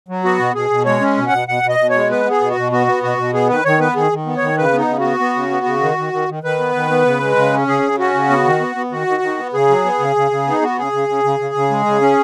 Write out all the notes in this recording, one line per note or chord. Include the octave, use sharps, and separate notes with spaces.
F#3
B3 F#4
B2
B2 G#4
B2
G#3 C#5
C#4
B2
F#5
B2
B2 F#5
B2
D#5
B2
C#5
G#3
B3 B4
B3
G#4
B2
F#4
B2
B3 F#4
B3
B2 F#4
B2
B3 G#4
D#3 B4
D#3 C#5
B3 B4
D#3 G#4
D#3
B3
C#5
D#3
C#3 B4
B3
D#4
C#3
B3 F#4
B3
C#3
B3
C#3
D#3
D#3
D#3
D#3
D#3 B4
B3
D#3
B3
C#3
G#3
C#3
C#4
C#3 G#4
C#3
C#4 F#4
C#3
B3
D#3
B3
B3
D#3 F#4
D#3
D#3
B3
C#3 G#4
F#3
B3
C#3
C#3
C#3
B3 D#4
B3 F#4
C#3 G#4
C#3
C#3
C#3
C#3
C#3
G#3
C#3
C#4